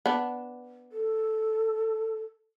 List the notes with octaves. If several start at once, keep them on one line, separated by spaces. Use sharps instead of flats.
B3 D4
A4